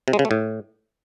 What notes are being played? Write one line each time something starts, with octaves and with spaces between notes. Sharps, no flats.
C3
G#3
C#3
A3
A2